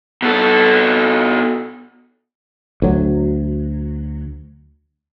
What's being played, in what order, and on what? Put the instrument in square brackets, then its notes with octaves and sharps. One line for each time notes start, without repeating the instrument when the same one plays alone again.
[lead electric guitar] B2 A4
[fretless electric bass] D2 F#3